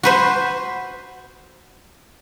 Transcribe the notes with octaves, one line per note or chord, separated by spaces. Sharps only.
F#4 B4 C5